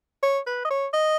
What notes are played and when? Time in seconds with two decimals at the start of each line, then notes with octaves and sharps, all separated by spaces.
0.23 C#5
0.47 B4
0.65 D#5
0.71 C#5
0.93 D#5